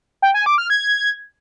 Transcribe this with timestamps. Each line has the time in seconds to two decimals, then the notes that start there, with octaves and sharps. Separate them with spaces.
0.22 G5
0.34 G#5
0.46 D6
0.58 F6
0.70 G#6